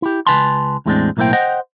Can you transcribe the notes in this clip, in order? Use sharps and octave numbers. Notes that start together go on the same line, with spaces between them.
E4 G4
C#2 F#2 B4 G#5 A5 C6
E2 A2 G#3 A3 C4 D4
B1 A2 A#3 E4 C5 G5
C5 D#5 F#5 G5